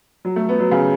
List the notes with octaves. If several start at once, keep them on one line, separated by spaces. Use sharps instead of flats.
F#3
A3
B3
F#3
C#3